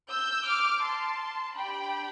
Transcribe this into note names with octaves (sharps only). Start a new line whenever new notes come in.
E6 G6
D6 F6
A5 C6
D4 G4 G5 B5